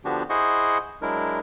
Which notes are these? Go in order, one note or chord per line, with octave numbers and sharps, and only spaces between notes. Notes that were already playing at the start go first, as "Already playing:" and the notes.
D3 F3 B3 D4 F#4 G4
E4 G#4 C5 D#5 F#5 C#6
F#3 G#3 D4 E4 A#4